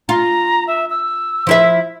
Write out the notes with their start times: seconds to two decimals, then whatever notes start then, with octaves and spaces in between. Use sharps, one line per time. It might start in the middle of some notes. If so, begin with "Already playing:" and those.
0.09 F4 A#5
0.67 E5
0.90 E6
1.47 F3 E4 E5